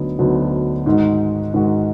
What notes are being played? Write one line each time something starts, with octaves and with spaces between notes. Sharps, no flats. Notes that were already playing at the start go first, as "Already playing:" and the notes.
Already playing: D2 D3 F#3 B3 D#4
D2 D3 F#3 B3 D#4
G#2 D#3 G#3 D#4 F#4
G#2 D#3 G#3 D#4 F#4